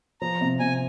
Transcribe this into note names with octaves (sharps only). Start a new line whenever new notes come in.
F3 A#5
C3
C3 G#5